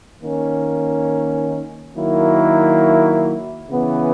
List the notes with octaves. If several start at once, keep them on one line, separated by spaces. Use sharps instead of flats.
D#3 A#3 C#4
D#3 F#3 A#3 E4
C#3 E3 B3